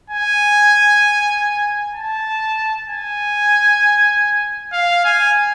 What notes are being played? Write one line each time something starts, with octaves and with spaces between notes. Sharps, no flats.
G#5
A5
G#5
F5
G#5